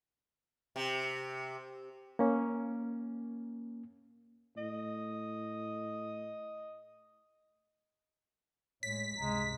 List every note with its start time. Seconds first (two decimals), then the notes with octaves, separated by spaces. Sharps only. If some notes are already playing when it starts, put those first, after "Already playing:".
0.76 C3
2.19 A#3 C#4
4.57 A2 D#5
8.83 A2 G#3 C#5 B6
9.18 C#2 G2 C3 G#3 A#5